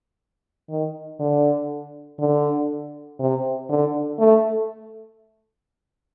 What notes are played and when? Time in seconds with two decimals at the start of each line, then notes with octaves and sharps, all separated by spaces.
0.69 D#3
1.20 D3
2.19 D3
3.19 C3
3.69 D3
4.19 A3